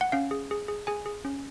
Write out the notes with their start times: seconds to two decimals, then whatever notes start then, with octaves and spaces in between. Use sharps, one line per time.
0.01 F#5
0.12 C#4 F5
0.31 G#4
0.51 G#4
0.68 G#4
0.87 G#4 G#5
1.06 G#4
1.25 C#4